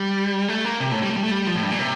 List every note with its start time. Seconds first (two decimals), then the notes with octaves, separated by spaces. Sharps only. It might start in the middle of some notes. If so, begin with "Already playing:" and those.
Already playing: G3
0.48 A3
0.65 A#3
0.80 C3
0.91 A2
1.03 G3
1.10 A3
1.17 G3
1.24 A3
1.31 G3
1.47 F3
1.55 A2
1.63 G2
1.71 A#2
1.79 C3